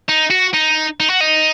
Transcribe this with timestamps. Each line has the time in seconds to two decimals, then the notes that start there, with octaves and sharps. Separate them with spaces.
0.09 D#4
0.31 F#4
0.54 D#4
1.00 D#4
1.10 F#4
1.21 D#4